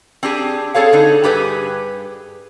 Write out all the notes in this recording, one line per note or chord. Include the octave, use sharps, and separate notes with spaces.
C4 D4 G4 G#4
C4 G#4 A4 C#5 F5
D3 D#4
G2 G4 G#4 B4